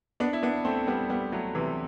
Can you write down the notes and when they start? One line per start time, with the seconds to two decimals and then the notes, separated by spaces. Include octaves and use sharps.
0.20 B3 D4
0.33 E4
0.43 B3 D4
0.65 A3 C4
0.87 G3 B3
1.10 G3 B3
1.32 F#3 A3
1.55 C3 E3